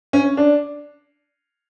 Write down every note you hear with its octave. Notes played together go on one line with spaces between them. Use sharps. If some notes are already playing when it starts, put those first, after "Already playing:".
C#4
D4